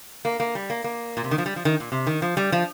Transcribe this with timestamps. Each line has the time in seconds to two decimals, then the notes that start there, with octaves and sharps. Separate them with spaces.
0.25 A#3
0.40 A#3
0.55 G3
0.70 A#3
0.84 A#3
1.17 A#2
1.24 C3
1.31 D#3
1.38 F3
1.46 G3
1.56 F3
1.65 D#3
1.80 A#2
1.92 C3
2.07 D#3
2.22 F3
2.37 G3
2.52 F3